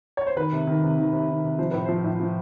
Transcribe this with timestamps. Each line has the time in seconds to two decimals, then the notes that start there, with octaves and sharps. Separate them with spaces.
0.17 C#5
0.27 C5
0.36 D#3 B4
0.52 C3
0.67 D#3
0.83 C3
0.98 D#3
1.12 C3
1.28 D#3
1.44 C3
1.58 F3 C5
1.71 A2 B4
1.85 F3 C5
2.04 A2
2.20 F3